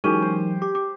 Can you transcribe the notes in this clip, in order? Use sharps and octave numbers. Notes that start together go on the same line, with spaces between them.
E3 F#3 G#3 C#4 D#4 G4 A#4 D#7
C5
G4 D6
D6